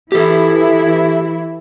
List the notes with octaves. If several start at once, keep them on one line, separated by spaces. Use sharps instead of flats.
E3 E4 G4 A4